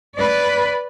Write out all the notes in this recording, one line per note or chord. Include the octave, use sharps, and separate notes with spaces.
B4 D5